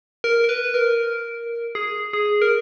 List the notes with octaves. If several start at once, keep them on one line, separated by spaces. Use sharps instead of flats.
A#4
A#4
B4
A#4
G#4
G#4
A#4